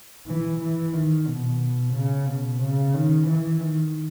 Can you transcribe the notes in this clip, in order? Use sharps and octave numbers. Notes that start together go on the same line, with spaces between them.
E3
E3
D#3
B2
C#3
B2
C#3
D#3
E3
D#3